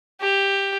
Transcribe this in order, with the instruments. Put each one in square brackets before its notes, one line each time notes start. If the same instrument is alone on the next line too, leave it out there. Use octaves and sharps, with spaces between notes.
[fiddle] G4